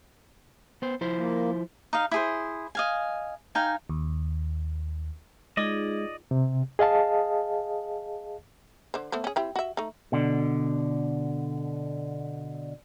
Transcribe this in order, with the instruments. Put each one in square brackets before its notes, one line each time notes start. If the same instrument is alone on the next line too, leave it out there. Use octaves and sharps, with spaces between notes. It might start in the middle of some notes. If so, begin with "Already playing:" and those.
[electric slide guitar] B3 C5
F3 E4 C5
[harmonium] A#3
[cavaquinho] D#4 D#5 F5
E4 G#4 C5
D#5 F5 G#5
D#4 F5 G5 G#5
[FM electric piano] D#2
[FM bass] G#3 [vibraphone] D#4 F4 G#4 [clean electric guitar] D5 D#5
[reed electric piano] C3
G#4 D#5 F5 A5
[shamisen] D3 C5
A3 B3 C5
C#4 G#4
C4 E4 G4
F#4 E5
A3 D#4
[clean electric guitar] B2 D3